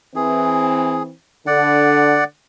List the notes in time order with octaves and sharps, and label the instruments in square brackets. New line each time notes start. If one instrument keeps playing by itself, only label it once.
[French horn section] E3 C4 [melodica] G#4
[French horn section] D3 [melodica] D5 F#5